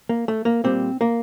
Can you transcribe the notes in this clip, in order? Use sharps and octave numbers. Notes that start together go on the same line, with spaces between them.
A#3
A3
A#3
A#2 G3 C4
A#3